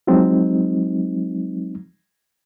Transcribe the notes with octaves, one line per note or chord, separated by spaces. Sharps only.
F3 F#3 G#3 C4 D#4